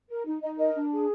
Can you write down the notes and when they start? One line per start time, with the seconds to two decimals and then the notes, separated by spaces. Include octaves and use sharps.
0.09 A#4
0.26 D#4
0.42 D#4 D#5
0.58 A#4 D#5
0.75 D4
0.92 G#4